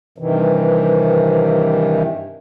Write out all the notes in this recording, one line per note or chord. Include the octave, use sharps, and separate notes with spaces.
G2 C3 D#3 E3